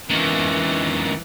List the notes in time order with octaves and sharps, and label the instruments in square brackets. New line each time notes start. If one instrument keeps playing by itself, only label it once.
[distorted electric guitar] C#2 D#3 [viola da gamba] E3